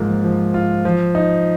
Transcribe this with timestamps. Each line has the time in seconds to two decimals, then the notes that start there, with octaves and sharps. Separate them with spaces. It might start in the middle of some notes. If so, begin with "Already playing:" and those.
Already playing: G#2 F3 A#3 F4
0.24 F3
0.54 F4
0.85 F3
1.15 D#4